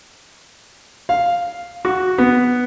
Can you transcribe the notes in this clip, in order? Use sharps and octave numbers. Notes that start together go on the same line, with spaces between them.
F5
F#4
B3